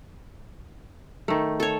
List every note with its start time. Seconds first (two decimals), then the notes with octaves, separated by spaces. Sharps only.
1.28 D#3 A3
1.60 A4 C#5